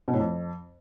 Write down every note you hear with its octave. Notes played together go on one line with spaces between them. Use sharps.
B2
A2
F2